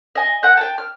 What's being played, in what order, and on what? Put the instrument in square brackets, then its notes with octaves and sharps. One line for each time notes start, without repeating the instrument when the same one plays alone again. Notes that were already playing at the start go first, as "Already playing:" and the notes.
[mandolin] D#5 G#5
F#5 F#6 G6
G5 A5
F6